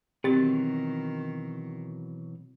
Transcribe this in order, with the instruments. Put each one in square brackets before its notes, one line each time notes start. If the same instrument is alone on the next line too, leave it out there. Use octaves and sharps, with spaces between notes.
[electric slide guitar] B2 E3 F#3 [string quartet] D#3 [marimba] C4 [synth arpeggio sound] G4 A6